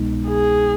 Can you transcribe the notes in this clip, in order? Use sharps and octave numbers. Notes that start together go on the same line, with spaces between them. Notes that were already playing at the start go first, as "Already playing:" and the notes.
Already playing: C2 B2 G#3 B3 D#4
G#4